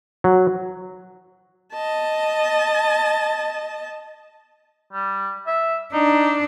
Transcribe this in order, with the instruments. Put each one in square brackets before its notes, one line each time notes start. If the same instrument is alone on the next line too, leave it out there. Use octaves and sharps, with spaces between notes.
[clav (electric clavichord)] F#3
[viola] D#5 A5
[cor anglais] G3
E5
[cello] D4 [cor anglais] D#4